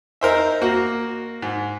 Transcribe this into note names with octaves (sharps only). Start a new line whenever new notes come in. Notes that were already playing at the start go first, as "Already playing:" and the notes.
D#4 A#4 C5 E5
A#3 F#4
G#2